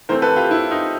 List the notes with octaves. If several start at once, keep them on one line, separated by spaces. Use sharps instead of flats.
E3 A3 C4 A#4 C5
A4 B4
F4 G4
E4
D#4 F4